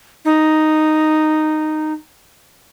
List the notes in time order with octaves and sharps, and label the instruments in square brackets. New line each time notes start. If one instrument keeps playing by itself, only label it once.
[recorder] D#4